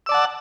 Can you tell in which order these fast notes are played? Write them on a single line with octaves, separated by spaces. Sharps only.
E6 D5 A5 F#5